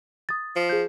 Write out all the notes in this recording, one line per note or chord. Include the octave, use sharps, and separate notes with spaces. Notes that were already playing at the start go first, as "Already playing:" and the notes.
D#6 A6
F3
G#4 G6